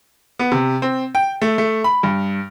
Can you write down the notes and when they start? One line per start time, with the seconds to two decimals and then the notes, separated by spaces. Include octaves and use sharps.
0.39 B3
0.52 C3
0.82 C4
1.15 G5
1.42 A3
1.58 A3
1.84 B5
2.03 G2